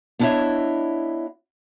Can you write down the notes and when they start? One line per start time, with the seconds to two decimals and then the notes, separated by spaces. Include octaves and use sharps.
0.19 B3 D4 E4 C#5 D#5 E5